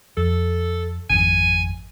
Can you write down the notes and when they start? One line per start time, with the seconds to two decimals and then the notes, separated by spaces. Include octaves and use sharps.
0.17 F2 A4
1.10 G#1 F2 G#5